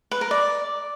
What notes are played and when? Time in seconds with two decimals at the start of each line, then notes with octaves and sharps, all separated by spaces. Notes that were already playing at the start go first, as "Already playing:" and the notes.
0.11 B4
0.21 A#4
0.31 D5